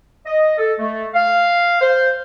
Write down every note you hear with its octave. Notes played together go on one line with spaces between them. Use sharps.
D#5
A4
A3
F5
C5